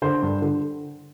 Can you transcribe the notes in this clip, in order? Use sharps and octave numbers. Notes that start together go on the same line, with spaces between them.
D3 C5
G2
D3